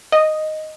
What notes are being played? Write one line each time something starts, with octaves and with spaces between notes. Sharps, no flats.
D#5